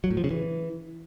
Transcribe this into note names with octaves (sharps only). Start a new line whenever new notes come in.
F#3
A2
F3
C#3
E3